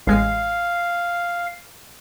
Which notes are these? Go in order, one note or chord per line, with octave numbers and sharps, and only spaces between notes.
A1 G#3 F5 C7